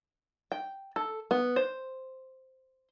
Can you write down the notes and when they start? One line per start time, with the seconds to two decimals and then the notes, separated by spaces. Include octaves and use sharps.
0.52 G5
0.96 A4
1.31 B3
1.56 C5